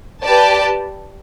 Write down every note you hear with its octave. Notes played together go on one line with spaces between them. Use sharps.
G4 B4 D5 A5